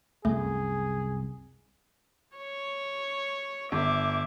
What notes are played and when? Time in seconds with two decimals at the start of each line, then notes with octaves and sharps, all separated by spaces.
0.25 C2 F#2 A3 G#4
2.37 C#5
3.72 G1 E5 D6